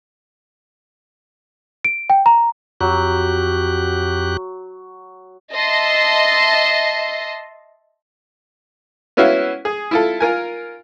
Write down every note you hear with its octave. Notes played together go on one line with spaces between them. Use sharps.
D7
G5
A#5
F2 F#3 G4 F#6
D#5 E5 A5 C6
B3 C#4 E4 F#4 E5 F5
G#4
E4 F4 A4
F4 A#4 G#5